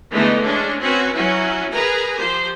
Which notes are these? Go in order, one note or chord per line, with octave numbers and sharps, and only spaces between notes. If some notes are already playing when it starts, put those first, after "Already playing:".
D3 E3 G#3 A3 B3 D#4
G#3 C#4 D4
C4 C#4 F#4 B4
F#3 C#4 E4 F#4
G#4 A#4 B4 G#5 A#5
F3 G4 C5